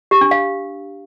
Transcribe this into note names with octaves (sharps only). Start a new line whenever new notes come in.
G4
D4
F5